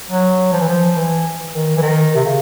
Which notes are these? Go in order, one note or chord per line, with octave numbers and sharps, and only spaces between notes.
F#3
F3
E3
F3
E3
D#3
E3
D#3
C3
C#3